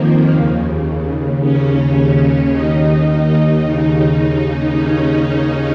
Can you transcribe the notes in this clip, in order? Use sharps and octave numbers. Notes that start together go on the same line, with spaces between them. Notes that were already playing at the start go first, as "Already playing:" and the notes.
Already playing: F2 D#3 F3 A#3
D#2 C#3
D#2 C#3 C#4
D#2 D#3 D#4
D#2 C#3
D#2 C#3 C#4